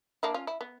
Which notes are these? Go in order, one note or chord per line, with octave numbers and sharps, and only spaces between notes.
A#3 D4 E4
C#4 F4
E4
B3